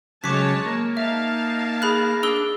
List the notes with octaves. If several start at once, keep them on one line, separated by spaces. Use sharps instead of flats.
C#3 F#3 G#3 C#5 A5 D6 B6
A#3
D#4 E5 F5 A5
G#4 B5 F#6
D4 G#4 E6 G7